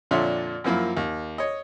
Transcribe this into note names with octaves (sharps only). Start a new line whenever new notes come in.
F2 A#2 D3 C#5 E5 C6
F#2 F3 A#3 E4 F4
D#2
C#5 D#5